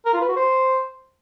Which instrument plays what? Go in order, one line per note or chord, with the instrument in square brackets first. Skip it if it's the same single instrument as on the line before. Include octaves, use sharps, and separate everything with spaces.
[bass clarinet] A#4
F4
B4
F#4
C5